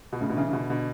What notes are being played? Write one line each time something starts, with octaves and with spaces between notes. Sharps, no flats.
B2
A2 C#3
B2 D3
C#3 E3
C#3
B2 D3
B2 D3